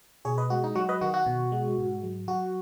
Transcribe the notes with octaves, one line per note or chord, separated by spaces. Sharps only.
B2 G#4 C#5
B4 D#5
G#3 F#4
D#4
F#3 F#4
B4 D#5
D#3 F#4
F#4
B2
G#3
G#2
F#3
F#3 F#4